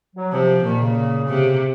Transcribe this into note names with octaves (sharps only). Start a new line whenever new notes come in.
F#3
C3 F3
A#2 D#3
C#3
C3